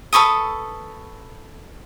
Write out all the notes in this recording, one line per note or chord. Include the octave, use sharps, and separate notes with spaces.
A4 B4 C#6 D#6